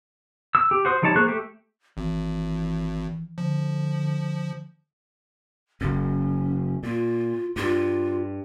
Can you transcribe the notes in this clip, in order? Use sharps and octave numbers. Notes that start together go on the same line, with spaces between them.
E6
G4
F#4 C5 D#6
F3 G3 D#4 C#5 A5
A#3 G#4 C5 C#6 F#6
A3 G4
G#1 E3
D3 F3
F#1 F#2 C#4
A#2 F4
G2 F4